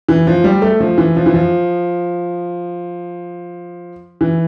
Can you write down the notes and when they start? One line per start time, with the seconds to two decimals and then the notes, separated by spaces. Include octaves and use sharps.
0.09 E3
0.27 F3
0.44 G3
0.62 A3
0.80 F3
0.98 E3
1.16 F3
1.26 E3
1.34 F3
4.21 E3